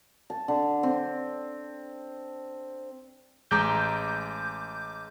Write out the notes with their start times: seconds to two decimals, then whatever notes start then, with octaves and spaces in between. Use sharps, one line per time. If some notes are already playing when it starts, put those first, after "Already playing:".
0.30 A5
0.48 D3
0.83 C4
3.51 A1 G#3 A#5 D6 G6